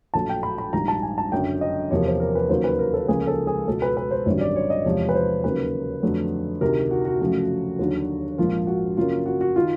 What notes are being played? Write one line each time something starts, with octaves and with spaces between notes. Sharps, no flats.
A#1 A2 F#3 A3 A5
G5
B5
B5
A#1 G#2 D#3 G3 A#5
A5
G#5
A5
F#1 F#2 D3 G5
D#5
E2 C3 F3 A#3 C#5
C5
A#4
B4
D#2 C#3 F#3 A#3 C5
B4
A#4
A4
C#2 C#3 F3 A#3 G#4
A4
G#4
C#2 B2 G#3 A4
B4
B4
C5
G#1 F#2 D3 G3 C#5
D5
C#5
D#5
E2 C3 F3 G#3 C#5
B4
C5
D#2 C#3 F#3 A#3 B4
F2 D3 F#3 A3
D2 C3 D#3 A#4
F#4
F#4
F#2 C#3 F3 A3
D#2 D3 F#3
A#1 G#2 F3 A#3 F4
F#4
F#2 C#3 F#3 A#3 F4
F#4
F#4
D#3 F4